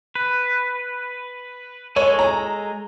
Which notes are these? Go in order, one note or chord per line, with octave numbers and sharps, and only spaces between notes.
B4
G#3 A4 C#5 G#5
A#5